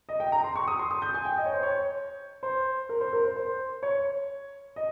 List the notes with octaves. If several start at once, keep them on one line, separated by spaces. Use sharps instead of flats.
D#5
G5
A#5
C6
C#6
D#6
C6
D#6
G6
G#5
G5
D#5
C#5
C5
C#5
C5
A#4
C5
A#4
C5
C5
C#5
D#5